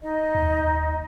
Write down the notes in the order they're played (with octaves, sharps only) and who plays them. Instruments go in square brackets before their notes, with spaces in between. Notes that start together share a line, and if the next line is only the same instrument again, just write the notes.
[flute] D#4 [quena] D#5
[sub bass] D#2